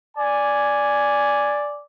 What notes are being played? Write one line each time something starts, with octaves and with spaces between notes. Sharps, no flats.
D5 G#5